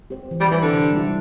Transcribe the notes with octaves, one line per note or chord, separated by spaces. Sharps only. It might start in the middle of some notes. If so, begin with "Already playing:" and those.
C4 G4 C5
E3
G3
E3 C4 G4 C5
D3
C3
G3 E4